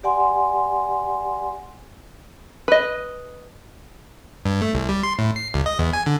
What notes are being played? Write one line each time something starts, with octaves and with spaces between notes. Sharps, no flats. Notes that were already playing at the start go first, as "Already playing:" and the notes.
G4 D5 F#5 G#5 C6
B4 D#5
G2
A3
C2
G3
C6
A2
C7
C#2
D#5
E2
G#5
D3